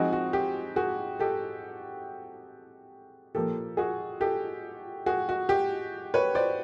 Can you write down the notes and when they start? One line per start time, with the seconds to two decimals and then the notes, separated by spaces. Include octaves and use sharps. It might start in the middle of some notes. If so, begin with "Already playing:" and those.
Already playing: F3 G#3 C4 D#4 F#4 G#4
0.13 F#4
0.33 G4
0.76 F#4 G#4
1.19 G4 A4
3.35 A#2 F3 A#3 G4 A4
3.77 F#4 G#4
4.20 G4 A4
5.06 F#4 G#4
5.29 F#4
5.49 G4
6.14 B4 C#5
6.35 C5 D5